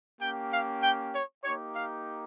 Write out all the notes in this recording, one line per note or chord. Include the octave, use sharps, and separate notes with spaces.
A#3 C#4 G4 G5
F5
G5
C#5
A#3 D#4 G4 C#5
F5